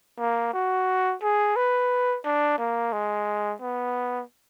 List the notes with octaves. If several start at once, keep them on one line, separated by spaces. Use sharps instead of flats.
A#3
F#4
G#4
B4
D4
A#3
G#3
B3